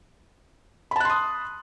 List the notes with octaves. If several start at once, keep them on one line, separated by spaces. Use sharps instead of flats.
A5 B5 C6 D#6 F#6